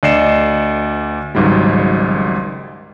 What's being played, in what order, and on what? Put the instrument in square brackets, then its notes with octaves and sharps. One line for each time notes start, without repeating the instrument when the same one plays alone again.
[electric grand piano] D2 D5 D#5 C7 C#7 E7
G#1 C#2 G#2 F#3 G3